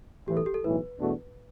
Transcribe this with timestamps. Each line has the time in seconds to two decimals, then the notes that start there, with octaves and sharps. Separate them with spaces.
0.28 B1 A2 E3 G4
0.37 A4
0.46 G4
0.54 A4
0.64 B1 A2 E3 B4
0.99 E2 B2 A3 D4 F#4